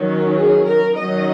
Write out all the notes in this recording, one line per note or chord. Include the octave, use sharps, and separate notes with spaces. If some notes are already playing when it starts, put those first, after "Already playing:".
Already playing: D#3 F#3 C#4
G#4
A#4
D#3 F#3 C#4 D#5